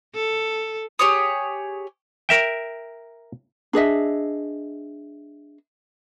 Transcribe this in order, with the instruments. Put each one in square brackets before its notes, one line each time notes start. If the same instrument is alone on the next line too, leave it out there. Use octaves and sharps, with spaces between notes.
[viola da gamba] A4
[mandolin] G4 G#4 C#5 D#6
[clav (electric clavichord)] A#4 E5 G5
[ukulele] D4 G#4 D#5 E5